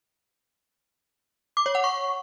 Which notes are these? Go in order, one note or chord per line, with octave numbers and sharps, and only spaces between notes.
D6
C#5
F#5
C#6